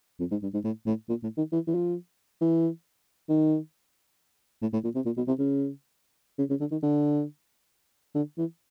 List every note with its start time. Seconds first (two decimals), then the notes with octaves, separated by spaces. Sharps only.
0.20 F2
0.31 G#2
0.43 G2
0.54 G#2
0.64 A2
0.87 A2
1.09 A#2
1.23 A2
1.37 D#3
1.52 E3
1.67 E3
1.75 F3
2.41 E3
3.29 D#3
4.62 A2
4.73 A2
4.84 A#2
4.95 C3
5.06 A#2
5.17 B2
5.28 C3
5.39 C#3
6.39 C#3
6.50 C#3
6.60 D3
6.72 D#3
6.83 D3
8.15 D3
8.38 E3